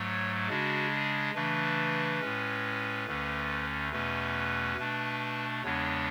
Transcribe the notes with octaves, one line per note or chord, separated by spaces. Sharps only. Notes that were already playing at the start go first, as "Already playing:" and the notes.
Already playing: G#2 F#3 A3 C#5
C#3 G#3 D4 F#4
G#4
C#3 E3 A3 D4 B4
A2 G#3 C#4
D2 D3 A3 C#4
E2 B2 A3 C#4 B4
B2 A3 D4
E2 C#3 G#3 B3 D4 C#5